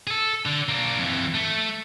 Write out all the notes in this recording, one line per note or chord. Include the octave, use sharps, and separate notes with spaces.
G#4 A4
D3
A#3 D4
F2 E3
A3